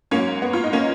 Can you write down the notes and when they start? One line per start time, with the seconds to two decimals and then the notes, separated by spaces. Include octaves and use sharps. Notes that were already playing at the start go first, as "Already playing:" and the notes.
0.11 G#2 F#3 A#3 C#4
0.42 B3
0.53 F4
0.64 D#4
0.73 A#3 C#4